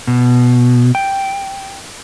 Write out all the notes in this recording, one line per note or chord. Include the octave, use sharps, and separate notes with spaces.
B2
G5